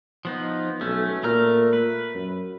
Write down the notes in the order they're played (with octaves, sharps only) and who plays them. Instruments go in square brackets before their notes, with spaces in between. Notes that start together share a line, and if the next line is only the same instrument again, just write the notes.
[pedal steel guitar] F3 B3 D#4
[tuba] B1 [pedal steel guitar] A3 C#4
[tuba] A#2 [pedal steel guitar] A3 A#5 F6
[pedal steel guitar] B4
[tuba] F#2